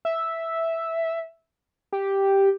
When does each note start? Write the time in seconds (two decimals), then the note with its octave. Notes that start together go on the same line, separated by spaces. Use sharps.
0.05 E5
1.93 G4